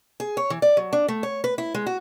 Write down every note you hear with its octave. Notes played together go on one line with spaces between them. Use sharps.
G#4
C#5
E3
D5
F#3
D4
A3
C#5
B4
E4
G#3
F#4